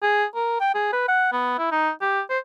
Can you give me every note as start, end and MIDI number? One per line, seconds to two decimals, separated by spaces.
0.03 0.25 68
0.35 0.56 70
0.60 0.74 79
0.75 0.91 68
0.93 1.07 71
1.08 1.30 78
1.33 1.55 59
1.58 1.67 64
1.72 1.90 63
2.01 2.21 67
2.30 2.38 72